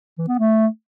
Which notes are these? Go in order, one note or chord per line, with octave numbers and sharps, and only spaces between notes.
E3
B3
A3